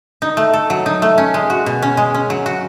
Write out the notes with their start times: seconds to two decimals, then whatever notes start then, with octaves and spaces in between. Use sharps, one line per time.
0.22 D#4
0.37 A3
0.53 A4
0.70 F#3
0.86 D#4
1.02 A3
1.18 C#4
1.34 G#3
1.50 F#4
1.66 B2
1.82 C#4
1.97 G#3
2.14 C#4
2.30 F#3
2.46 F#4